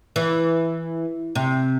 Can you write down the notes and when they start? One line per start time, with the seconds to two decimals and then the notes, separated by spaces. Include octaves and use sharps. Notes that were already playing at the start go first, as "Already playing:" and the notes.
0.16 E3
1.35 C3